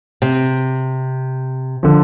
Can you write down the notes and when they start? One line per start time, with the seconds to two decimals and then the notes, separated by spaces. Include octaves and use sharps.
0.22 C3
1.83 D3 F3